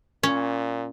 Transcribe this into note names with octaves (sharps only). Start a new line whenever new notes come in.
A#2 C#4